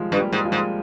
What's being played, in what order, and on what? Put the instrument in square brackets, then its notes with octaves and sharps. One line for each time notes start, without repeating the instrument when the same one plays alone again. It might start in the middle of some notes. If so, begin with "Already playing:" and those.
Already playing: [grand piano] D#3 F3 G3 G#3
[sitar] G2
[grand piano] G3 A#3
[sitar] G#2
[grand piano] F3 G#3
[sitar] G#2